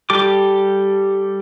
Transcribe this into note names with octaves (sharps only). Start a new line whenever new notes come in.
G3 G4 A4 D6